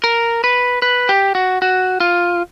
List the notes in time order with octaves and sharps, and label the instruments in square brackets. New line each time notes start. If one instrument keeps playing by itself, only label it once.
[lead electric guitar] A#4
B4
B4
G4
F#4
F#4
F4